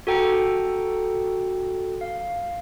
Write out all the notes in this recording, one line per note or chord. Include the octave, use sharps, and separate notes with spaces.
F#4 A4 G5 A#5 C#7
F5